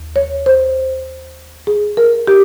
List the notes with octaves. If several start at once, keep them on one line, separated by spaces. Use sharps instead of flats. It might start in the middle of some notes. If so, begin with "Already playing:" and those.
Already playing: D#2
C#5
C5
G#4
A#4
G4